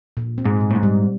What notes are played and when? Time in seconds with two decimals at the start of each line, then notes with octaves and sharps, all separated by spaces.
0.17 A#2
0.38 C4
0.45 G#2
0.60 A#2
0.71 A2
0.75 G#2
0.83 G3